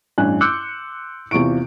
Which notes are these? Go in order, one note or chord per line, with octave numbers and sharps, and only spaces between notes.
A1 G2 G#5 F#6
C6 D6 E6 F#6 G6 C#7
E2 C3 F4 C#6 D7